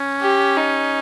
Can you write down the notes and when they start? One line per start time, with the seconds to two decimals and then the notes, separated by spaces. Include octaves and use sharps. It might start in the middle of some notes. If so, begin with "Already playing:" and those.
Already playing: C#4
0.22 G4
0.57 D#4